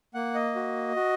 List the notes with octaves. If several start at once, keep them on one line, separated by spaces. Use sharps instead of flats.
A#3 F#5
D#5
F#4
F#4